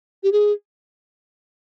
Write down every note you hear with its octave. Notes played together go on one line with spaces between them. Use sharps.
G4
G#4